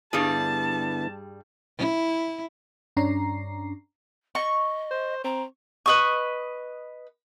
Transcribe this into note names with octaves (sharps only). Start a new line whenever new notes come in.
G2 D3 G3 B3 E4 G#4 A5
E4
G2 C#4 D4 A#5 C7
D#5 C#6
C5
C4 A#5
B4 D#5 C#6